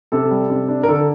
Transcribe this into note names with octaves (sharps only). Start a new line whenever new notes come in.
C3 A4
G3
C3
D4
A#4
D3 A4